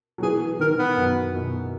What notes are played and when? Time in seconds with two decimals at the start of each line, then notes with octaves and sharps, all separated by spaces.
0.18 F#3
0.22 E3 G#4
0.60 D#3 A#4
0.78 B3
0.97 F#2
1.35 B2